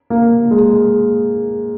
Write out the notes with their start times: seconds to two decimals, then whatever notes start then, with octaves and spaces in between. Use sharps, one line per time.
0.10 A#3
0.51 G#3